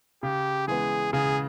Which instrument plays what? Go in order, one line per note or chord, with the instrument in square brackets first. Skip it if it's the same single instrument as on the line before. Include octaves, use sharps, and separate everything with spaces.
[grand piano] C#3 [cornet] G4
[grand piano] E3 G#3 B3 [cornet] G#4
[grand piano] C#3 [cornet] G#4